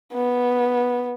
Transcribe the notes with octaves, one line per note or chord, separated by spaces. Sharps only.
B3